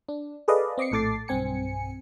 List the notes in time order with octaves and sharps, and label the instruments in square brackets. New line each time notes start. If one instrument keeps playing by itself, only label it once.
[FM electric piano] D4
G#4 A4 B4 D5 D#5 F5
C4 D#5 D6 C7 C#7
A#1 A2 A4 D6 A6 C7
B1 G2 C4 G#5 C#7